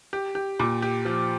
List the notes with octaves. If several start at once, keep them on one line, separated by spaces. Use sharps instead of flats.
G4
G4
A#2
G4
F3